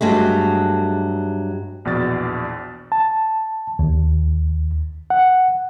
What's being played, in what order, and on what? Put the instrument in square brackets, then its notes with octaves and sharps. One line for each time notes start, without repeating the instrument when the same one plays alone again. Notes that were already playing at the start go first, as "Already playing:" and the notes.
[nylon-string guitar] G2 F#3 G#3 A3
[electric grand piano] A#1 E2 B2 D5 A6
[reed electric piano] A5
D#2
F#5